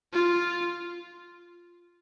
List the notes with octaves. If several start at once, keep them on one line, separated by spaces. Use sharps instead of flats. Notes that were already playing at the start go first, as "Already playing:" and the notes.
F4